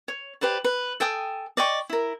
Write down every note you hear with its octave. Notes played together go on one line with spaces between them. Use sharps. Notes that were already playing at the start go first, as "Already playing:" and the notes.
C#5
G4 B4 C5 D5
B4
A4 G5 G#5 D#6
D5 D#5 G5 C#6
E4 A#4